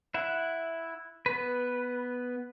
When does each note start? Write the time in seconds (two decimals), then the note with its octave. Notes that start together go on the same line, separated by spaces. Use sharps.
0.14 E4 E5 F#5
1.26 B3 B4